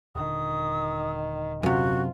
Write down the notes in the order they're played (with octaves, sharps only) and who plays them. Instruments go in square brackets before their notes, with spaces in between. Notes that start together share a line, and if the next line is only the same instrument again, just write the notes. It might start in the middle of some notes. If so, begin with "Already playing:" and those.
[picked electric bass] D#1 D3 [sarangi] D#3 [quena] D#6
[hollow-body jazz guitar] F#2 C3 [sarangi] F4 [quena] F#4